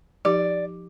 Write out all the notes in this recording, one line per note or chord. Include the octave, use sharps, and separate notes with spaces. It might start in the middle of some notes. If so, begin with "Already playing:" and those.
F3 D#4 G4 D5